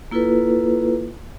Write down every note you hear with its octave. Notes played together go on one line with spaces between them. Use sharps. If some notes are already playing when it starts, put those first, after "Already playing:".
A#3 E4 F4 A4 B4